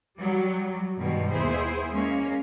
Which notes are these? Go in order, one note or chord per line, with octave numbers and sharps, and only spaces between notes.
F#3 G3
G2 B2 D#3 G3 G#3
D#2 B3 E4 G#4 C5
G#3 A#3 C#4